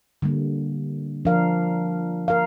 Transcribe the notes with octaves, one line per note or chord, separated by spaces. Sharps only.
D3 G3 A#3
F3 D4 A#4 F5
A#4 F5